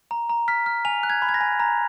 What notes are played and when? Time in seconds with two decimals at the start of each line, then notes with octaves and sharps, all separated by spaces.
0.11 A#5
0.29 A#5
0.48 F6 B6
0.66 F6
0.85 G#5 F7
1.03 F#6
1.10 G#6
1.22 B5
1.29 G#6
1.34 A#6
1.41 G#5
1.60 A#5